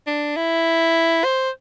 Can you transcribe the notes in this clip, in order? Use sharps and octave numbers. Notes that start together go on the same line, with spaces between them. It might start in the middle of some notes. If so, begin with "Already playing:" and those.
D4
E4
C5